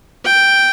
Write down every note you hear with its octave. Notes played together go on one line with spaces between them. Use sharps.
G5